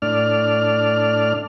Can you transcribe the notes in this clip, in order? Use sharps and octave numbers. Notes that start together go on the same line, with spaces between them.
A2 D4 D5 F6